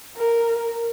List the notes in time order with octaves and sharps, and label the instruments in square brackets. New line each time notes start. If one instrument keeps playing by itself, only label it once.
[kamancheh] A#4